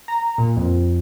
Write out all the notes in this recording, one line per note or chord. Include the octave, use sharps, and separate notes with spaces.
A#5
A#2
F2